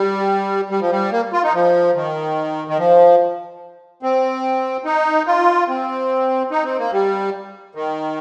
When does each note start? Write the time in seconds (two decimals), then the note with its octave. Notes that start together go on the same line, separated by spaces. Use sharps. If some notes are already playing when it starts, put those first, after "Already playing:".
Already playing: G3
0.70 G3
0.81 F3
0.91 G3
1.12 A#3
1.33 F4
1.43 D#4
1.54 F3
1.95 D#3
2.68 D#3
2.78 F3
4.03 C4
4.85 D#4
5.27 F4
5.68 C4
6.51 D#4
6.65 C4
6.79 A#3
6.93 G3
7.75 D#3